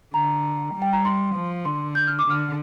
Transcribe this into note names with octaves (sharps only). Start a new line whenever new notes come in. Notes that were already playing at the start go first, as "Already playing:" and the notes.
D3 A#5
G3
G5
A#5
C6
F3
D3 C6
G6
F6
D6
D3 F6